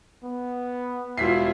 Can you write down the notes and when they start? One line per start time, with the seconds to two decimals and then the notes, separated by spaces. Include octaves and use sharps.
0.23 B3
1.18 E1 E4 F4 B6 C7